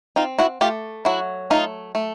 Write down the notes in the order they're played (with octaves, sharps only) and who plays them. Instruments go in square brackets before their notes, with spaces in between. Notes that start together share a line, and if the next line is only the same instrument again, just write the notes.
[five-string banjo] C4 D#4 F4
E4 F#4
A3 F4 G4
F#3 E4 F#4
A3 D#4 F4
A3